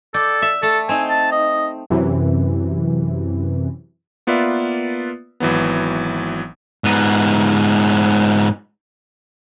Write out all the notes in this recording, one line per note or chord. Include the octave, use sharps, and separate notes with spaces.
A4 D5 G5
E5
A3 A4
C4 D#4 G#5
A5
D#5
F#2 C3 E3
A#3 B3 F4 B4 D5 E5
G#1 E3 F#3 B3
G#2 B3